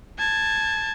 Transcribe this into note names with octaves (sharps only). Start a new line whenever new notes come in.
A5 G#6